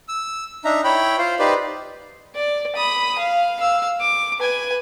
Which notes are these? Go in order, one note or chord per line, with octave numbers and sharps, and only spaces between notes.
E6
D4 D#4 E5 A#5
E4 C#5 G5 B5
F4 C5
D#4 G4 B4 C5 D5
D5
B5 D#6
F5
F5 E6
D6
B4 G#5